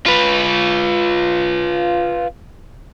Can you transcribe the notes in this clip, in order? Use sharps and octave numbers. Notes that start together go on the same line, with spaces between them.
F4 B4